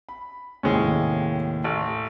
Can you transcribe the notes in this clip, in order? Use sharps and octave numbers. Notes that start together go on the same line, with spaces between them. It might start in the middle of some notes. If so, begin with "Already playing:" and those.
B5
D#2 A2 C3 G#3 C#4
A1